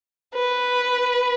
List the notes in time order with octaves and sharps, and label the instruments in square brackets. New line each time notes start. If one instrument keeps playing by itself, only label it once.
[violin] B4